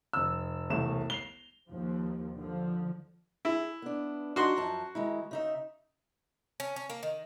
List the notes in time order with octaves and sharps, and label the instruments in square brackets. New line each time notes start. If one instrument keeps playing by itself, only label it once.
[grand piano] F1 E6
E1 C2 A3 E7
C7 F7 G7
[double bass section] D#2 F3
D3 F3
[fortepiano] E4 [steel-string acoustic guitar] G#4
[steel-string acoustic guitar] B3 D4
[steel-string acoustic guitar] D4 D#4 [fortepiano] F#4 C6
[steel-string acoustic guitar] F#2 F3 A5
D#3 G#3 E4
C#3 D#4 E5
[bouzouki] C#4
C#4
A#3
D#3